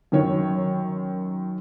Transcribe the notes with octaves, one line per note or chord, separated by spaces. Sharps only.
F#2 D#3 C#5